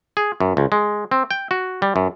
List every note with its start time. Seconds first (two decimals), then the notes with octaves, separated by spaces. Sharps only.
0.17 G#4
0.40 F#2
0.57 C#2
0.72 G#3
1.11 C4
1.31 G5
1.51 F#4
1.82 G3
1.96 F#2